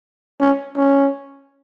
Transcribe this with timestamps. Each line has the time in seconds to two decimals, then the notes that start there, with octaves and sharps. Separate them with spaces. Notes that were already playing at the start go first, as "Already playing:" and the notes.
0.40 C#4
0.77 C#4